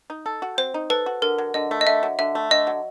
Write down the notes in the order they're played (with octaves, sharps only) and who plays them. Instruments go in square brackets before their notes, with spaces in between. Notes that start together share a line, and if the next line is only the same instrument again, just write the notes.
[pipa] D#4
A4
F#4
[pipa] C4 [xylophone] C5
[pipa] D#4
[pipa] A4 [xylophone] B4
[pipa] F#4
[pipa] D3 [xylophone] A#4
[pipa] F#3
[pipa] D3 [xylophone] D#5
[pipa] A3
[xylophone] D#5
[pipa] D3 [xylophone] E5
[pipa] F#3
[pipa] D3 [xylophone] E5
[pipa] A3
[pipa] D3 [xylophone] D#5
[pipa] F#3